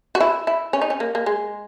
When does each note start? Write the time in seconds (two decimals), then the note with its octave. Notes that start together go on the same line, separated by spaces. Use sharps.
0.15 F#4
0.20 E4
0.47 E4
0.73 C#4
0.81 D#4
0.90 C#4
1.00 A#3
1.15 A#3
1.26 G#3